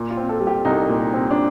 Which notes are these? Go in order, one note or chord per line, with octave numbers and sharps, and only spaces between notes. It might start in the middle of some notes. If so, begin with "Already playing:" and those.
Already playing: A#2
F4
C4
A4
G3
G4
C2 D#4
A#2
C4
D4